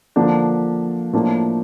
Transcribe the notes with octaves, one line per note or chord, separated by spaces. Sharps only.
D3 F3 A#3 D4
A2 F3 A#3 D4